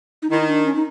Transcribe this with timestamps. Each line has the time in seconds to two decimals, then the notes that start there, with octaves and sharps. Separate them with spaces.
0.22 D#4
0.30 D#3 E4
0.40 D#4
0.48 D4
0.65 C#4
0.75 D#4